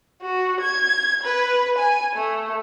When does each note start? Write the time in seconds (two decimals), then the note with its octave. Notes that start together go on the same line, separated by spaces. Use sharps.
0.21 F#4
0.60 G#6
1.23 B4
1.77 G#5
2.15 A3